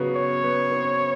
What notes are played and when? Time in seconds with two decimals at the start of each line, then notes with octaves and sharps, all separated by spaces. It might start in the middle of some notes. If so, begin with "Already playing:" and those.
Already playing: C#3 F#3 B3 C#4 F#4 B4
0.16 C#5
0.43 B3 B4
0.72 C4 C5